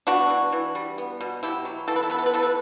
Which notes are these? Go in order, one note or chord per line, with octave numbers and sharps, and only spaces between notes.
B3 D4 F#4
E3
E3
G3
B3
B2
B2 E4 G4
F#3
E3 A4
B4
A4
B3 B4
A4
B4
E3 A4
B4